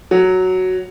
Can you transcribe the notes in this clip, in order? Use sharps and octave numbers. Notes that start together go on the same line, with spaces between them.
F#3